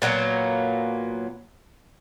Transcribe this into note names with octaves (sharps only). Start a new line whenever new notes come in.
A#2 F#3 A#3 B3